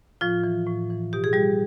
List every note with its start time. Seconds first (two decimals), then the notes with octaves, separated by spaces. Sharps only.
0.21 A2 F3 F4
0.44 E3
0.67 A2
0.90 E3
1.13 B2 G4
1.24 G#4
1.33 G3 G4